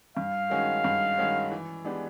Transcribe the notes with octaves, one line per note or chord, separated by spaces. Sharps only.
G2 F5
D#3 G#3 C#4 F#4
G2
D#3 G#3 C#4 F#4
E3
G#3 B3 D4 G4